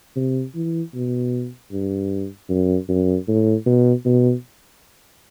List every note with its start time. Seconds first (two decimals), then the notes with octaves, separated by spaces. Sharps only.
0.16 C3
0.55 E3
0.94 B2
1.72 G2
2.50 F#2
2.89 F#2
3.28 A2
3.66 B2
4.05 B2